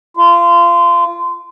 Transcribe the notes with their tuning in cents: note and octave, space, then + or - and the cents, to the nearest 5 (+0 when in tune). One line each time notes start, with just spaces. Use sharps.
F4 -25